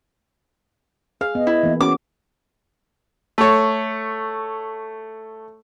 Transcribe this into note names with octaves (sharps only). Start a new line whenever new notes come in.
G#4 F5
B3 D#5
E4
E3 A#3 B3
C#4 F#4 G#4 D6
A3 C#5